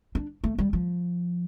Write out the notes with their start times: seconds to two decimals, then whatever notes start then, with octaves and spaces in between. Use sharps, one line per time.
0.15 D4
0.44 A3
0.58 G3
0.73 F3